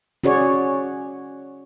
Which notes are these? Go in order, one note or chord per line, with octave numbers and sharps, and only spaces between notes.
C#4 F#4 G#4 C#5 D5